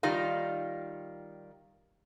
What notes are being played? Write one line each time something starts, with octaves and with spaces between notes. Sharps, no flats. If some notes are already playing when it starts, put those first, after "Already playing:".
D#3 G3 D#4 F4 F5